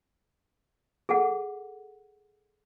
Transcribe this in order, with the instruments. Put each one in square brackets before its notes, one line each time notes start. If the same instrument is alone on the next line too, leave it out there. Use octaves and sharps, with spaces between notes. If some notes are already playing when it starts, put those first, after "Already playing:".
[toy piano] G#4 A4 F#5